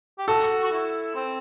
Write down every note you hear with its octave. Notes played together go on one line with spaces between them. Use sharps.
G4
F#4 A4
F#4
E4
C4